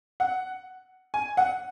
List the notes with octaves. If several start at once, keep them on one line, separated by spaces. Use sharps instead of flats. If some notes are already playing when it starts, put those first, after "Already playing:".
F#5
G#5
F#5